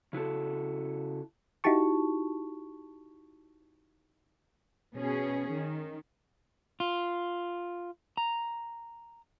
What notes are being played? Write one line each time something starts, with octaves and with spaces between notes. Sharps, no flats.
C#3 E4 F#4 A4
D#4 E4 F#4 G4 A5 C#6
B2 C#4 G#4
D#3
F4
A#5